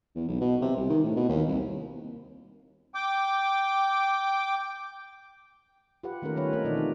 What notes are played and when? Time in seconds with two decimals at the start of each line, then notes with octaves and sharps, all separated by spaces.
0.15 E2
0.28 B1
0.41 B2
0.61 C3
0.77 C2
0.90 D#3
1.04 A2
1.16 B2
1.29 D#2
1.48 C2
2.95 G5 D6
6.03 F4 G4 B4 F#5
6.22 D#3 A3 A#3 C#4 A#4
6.36 D#3 G3 C#4 F4 B4 C#5
6.53 A3 C4 D#4 F4 A#4
6.64 B2 D#3 E3 D4 F4 D5
6.76 F3 C4 F4